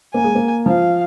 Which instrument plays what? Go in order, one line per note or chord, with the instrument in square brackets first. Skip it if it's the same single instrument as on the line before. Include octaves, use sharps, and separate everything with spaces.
[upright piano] A#3 [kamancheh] G#5
[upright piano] G#3
A#3
[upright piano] F3 [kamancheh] F5